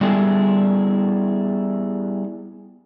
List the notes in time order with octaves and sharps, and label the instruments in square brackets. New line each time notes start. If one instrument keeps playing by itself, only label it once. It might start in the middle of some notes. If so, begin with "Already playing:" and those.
[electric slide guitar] G3 B3 E4 G#4 A4